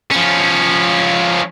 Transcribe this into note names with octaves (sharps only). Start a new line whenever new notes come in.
F3 C#4